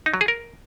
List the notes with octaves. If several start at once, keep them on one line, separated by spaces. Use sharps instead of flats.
D#4
F#3
G#4
A#4